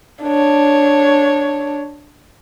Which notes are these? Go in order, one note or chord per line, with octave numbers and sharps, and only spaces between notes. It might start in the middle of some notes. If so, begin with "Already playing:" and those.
D4 C#5